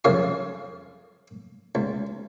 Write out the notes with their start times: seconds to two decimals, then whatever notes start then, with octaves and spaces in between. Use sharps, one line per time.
0.04 C2 F2 C#3 C#5 F5
1.75 C#2